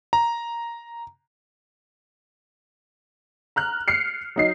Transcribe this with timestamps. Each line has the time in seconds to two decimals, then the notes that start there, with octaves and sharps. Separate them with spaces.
0.13 A#5
3.56 A#5 F6 F#6
3.88 F6 C7 C#7
4.36 F#3 D#4 C7